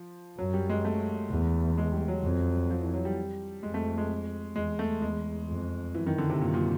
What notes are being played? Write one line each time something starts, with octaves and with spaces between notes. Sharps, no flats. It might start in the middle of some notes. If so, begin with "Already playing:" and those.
Already playing: F3
F#2 F#3
G3
G#3
A3
E2
G#3
G3
F#3
F2
F3
E3
F#3
G3
F2 G#3
A3
G#3
E2 G#3
A3
E2 G#3
F2
F#2 E3
D#3
D3
C3
F#2 A#2
A#2